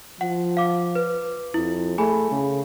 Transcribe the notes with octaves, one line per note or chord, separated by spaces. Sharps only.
F3 F#5
F5 D6
B4
F2 E4
A3 G#4 G#5 B5
C#3